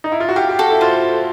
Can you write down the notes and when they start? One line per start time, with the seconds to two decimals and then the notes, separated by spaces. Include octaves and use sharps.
0.04 D#4
0.12 E4
0.20 F4
0.29 F#4
0.36 G4 F5
0.49 G4
0.59 F#4 A4
0.70 E4
0.81 F4 C5